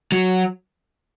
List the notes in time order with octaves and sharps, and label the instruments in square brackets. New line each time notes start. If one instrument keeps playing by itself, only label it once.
[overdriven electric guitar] F#3